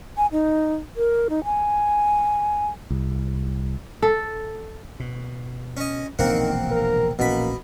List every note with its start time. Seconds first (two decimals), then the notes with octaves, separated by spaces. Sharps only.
0.17 G#5
0.32 D#4
0.97 A#4
1.30 D#4
1.44 G#5
2.91 C2
4.02 A4
5.00 B2
5.77 C#4 D#5
6.19 E1 A#1 C3 D#3 A#3 C4 F#5
6.71 A#4
7.19 A#1 B2 E3 A#3 C#4 B5